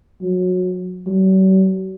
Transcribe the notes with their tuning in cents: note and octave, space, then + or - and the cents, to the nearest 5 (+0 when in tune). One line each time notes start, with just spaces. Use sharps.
F#3 -20
F#3 +45